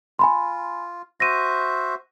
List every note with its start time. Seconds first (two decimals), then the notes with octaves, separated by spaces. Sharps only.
0.19 F4 G#5 B5 C6
1.20 F#4 C5 E5 A#6 D#7